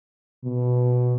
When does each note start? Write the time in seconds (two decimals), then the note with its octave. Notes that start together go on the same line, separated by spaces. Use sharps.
0.44 B2